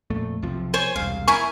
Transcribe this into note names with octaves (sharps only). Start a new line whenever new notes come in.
F2 A#2 A3
B1 C3 F3
C5 C#5 G#5
E1 C2 F5
E4 A#4 G#5 C#6